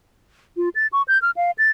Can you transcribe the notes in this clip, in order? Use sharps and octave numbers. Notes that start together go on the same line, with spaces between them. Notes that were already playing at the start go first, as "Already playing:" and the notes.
F4
A6
C#6
G6
F6
F5
A6